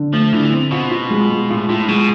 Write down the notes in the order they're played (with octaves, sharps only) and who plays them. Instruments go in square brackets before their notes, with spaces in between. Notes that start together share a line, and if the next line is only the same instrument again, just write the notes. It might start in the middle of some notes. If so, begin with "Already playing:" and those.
Already playing: [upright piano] D3
[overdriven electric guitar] F3 [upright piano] A3
[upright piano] D3 [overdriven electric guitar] E3
[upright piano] C4
[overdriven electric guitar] B2 [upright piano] F4
[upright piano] F4
G#3
G#3
[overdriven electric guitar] A2 [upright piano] F4
[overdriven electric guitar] A2 [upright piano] F4
[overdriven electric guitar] B2 [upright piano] G#3